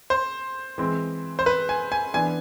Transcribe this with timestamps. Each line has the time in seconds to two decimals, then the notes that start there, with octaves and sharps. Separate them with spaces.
0.10 C5
0.78 E3 G#3 C4
1.39 C5
1.46 B4
1.69 G#5
1.92 G#5
2.14 E3 B3 D4 G#5